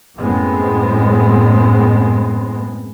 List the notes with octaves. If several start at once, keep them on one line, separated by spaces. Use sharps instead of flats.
F#2 A2 G#3 B3 C4